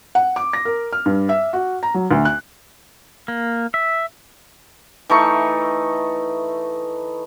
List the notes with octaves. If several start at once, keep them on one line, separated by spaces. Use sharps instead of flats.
F#5
D6
A#6
A#4
F6
G2
E5
F#4
A#5
F#3
D2
F#6
A#3
E5
E3 A3 D#4 C#6